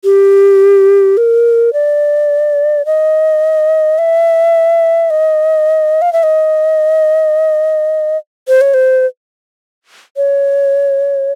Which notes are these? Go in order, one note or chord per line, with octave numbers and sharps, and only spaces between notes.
G4
A#4
D5
D#5
E5
D#5
F5
E5
D#5
C5
C#5
C5
C#5